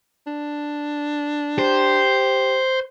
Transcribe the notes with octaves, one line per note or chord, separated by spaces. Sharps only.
D4
G4 C5